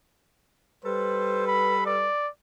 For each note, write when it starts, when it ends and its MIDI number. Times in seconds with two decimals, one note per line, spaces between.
0.84 2.07 55
0.84 2.07 69
0.84 2.07 71
0.84 1.47 72
1.47 1.84 83
1.86 2.29 74